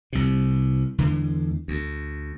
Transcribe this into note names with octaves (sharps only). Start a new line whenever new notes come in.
C2 C3
E2 D3 E3 G#3
D2